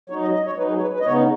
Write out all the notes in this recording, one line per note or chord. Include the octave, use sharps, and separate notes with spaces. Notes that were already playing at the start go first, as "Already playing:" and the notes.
F#3 D#4 C#5
D#5
D#5
C#5
F#3 D#4 B4
G#4
C#5
B4
B4
D#5
C#3 B3 D#4 C#5